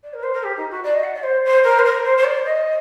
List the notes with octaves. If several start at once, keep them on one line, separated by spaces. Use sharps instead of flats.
D5
A#4
C5
A#4
G4
D#4
F#4
D5
D#5
F#5
D5
C5
C5
A#4
C5
A#4
C5
C5
D5
D#5